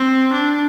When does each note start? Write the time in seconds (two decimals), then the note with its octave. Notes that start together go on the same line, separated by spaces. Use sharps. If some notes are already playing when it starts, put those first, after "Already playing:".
Already playing: C4
0.33 D4